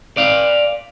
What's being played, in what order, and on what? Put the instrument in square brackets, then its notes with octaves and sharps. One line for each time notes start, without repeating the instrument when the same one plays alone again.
[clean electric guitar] D5 F5